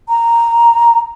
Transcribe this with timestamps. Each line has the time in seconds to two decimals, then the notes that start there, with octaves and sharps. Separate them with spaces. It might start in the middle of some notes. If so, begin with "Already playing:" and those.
0.09 A#5